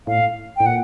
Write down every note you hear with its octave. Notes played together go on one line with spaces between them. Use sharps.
A2 F5
A2 G5
A#2 F#5